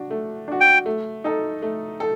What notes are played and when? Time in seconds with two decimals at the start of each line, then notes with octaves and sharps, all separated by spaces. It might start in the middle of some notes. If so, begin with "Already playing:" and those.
Already playing: D4 F#4
0.10 A3
0.48 D4 F#4
0.61 G5
0.86 A3
1.24 D#4 A4
1.62 A3
2.00 A4